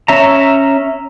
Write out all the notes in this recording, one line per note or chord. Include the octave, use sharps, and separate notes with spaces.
C#4 E5 A#5